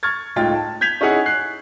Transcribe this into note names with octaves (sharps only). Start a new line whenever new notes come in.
C#6 F6 G#6 A6
C#2 A2 D#4 F4 G5 A6
A5
G6 G#6 B6 F7
C#4 D#4 E4 G#4 F#5
F#6 C7